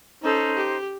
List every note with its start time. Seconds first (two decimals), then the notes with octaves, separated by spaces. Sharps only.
0.22 C#4 D#4 A4 C5
0.56 G4